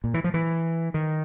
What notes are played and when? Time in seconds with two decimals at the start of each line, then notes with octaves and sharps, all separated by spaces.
0.04 A#2
0.14 E3
0.24 F3
0.34 E3
0.94 D#3